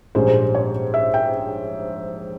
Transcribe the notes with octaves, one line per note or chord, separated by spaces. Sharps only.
A#1 G#2 G3 C#4 C5
C#5
E5
G5